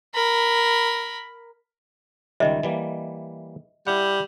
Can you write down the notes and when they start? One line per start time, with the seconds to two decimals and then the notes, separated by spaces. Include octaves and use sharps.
0.14 A#4 B5
2.40 C#2 D#3 G3 D#5 E5
2.63 E3 G3 A#3
3.87 G3 E4 F#5